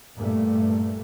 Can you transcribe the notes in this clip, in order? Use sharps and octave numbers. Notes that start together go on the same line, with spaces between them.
G2 A#2 A3